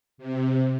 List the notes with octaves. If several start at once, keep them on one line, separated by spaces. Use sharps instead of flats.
C3